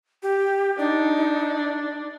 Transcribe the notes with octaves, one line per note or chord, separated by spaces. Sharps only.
G4
D4 D#4